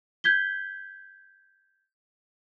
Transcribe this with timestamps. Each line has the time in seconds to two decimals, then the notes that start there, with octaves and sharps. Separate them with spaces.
0.24 G6 G#6 B6 G7